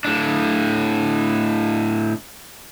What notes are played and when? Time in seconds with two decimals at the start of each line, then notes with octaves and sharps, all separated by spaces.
0.05 A2 D4